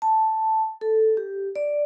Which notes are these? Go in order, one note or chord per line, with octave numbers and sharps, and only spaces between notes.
A5
A4
G4
D5